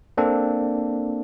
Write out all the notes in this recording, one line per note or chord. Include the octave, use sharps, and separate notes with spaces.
A#3 C4 D4 A4